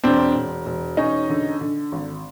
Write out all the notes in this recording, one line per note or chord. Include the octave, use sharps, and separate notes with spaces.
E1 C4 D4
E1
E1
E1 C#4 D#4
D3
D3
G#1